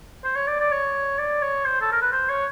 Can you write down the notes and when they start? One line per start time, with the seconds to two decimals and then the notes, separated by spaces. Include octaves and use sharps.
0.24 C5
0.36 C#5
0.48 D5
0.60 D5
0.72 C#5
1.18 D5
1.42 C#5
1.65 C5
1.81 A4
1.92 A#4
2.02 B4
2.13 C5
2.29 C#5